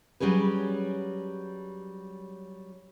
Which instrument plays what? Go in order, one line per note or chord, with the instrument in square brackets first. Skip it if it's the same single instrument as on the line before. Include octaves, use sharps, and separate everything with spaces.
[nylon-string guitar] F#3 G3 C#4 G#4 B4